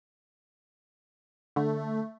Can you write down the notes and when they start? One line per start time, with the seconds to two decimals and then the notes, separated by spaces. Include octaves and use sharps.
1.56 D3 A3